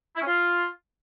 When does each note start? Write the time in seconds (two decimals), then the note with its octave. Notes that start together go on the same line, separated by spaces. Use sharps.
0.16 E4
0.21 C#4
0.27 F4